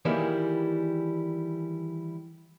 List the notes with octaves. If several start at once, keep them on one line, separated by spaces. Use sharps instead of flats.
D#3 E3 G3 G#3 A#3 E4